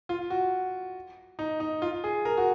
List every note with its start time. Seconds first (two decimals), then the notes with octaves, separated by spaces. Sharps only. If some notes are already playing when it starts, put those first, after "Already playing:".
0.09 F4
0.30 F#4
1.39 D#4
1.60 D#4
1.82 F4
2.04 G#4
2.25 A#4
2.37 F#4